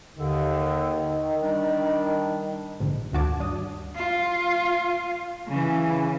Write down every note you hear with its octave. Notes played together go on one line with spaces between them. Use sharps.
D#2 D3 D#3
G3 D4
A#1 G#2 D3
D2 D#3 F#4 A5 D6 G#6
G2 D4 D#6
F4
C#3 E3